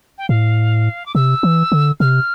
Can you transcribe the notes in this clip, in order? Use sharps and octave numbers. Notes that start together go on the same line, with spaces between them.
G5
A2 F5
D6
C3 E6
E3
D3
C3 F6